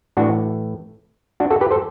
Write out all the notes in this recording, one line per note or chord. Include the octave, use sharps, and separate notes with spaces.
A2 E3 D4 F#4
D4 F#4
F#4 A4
G4 B4
A4 C5